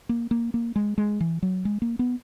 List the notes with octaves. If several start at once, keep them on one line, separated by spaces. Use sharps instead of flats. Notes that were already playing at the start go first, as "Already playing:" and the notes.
A#3
A#3
A#3
G#3
G#3
E3
F#3
G#3
A#3
B3